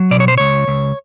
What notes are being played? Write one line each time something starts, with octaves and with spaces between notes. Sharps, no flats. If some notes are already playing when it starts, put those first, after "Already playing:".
Already playing: F#3
B2 D5
C#5
C5
C#2 C#5
C#2